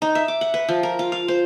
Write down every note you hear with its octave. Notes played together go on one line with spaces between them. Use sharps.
D#4
E5
D6
F#5
B4
F3
A#4
F4
F5
C5